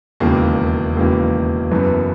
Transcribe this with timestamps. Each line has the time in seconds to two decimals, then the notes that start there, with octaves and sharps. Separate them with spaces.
0.20 E1 D#2 C#3 E3 A#3
0.96 E1 D#2 C#3 E3 A#3
1.71 F#1 F#2 E3 B3